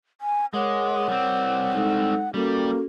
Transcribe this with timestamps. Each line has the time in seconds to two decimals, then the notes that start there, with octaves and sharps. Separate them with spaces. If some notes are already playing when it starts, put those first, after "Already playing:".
0.21 G#5
0.54 G#3 A#4 C#5 F#5 D6
1.09 G3 C4
1.74 G#3 D#4 A4
2.34 G3 A#3 C#4 F#4 A4